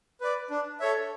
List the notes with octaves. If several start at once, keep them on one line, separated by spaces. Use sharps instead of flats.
B4 D5
D4
A4 C#5 E5